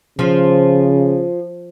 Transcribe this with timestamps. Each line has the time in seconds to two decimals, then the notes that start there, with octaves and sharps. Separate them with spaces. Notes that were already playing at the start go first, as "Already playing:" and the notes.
0.19 C#3 F3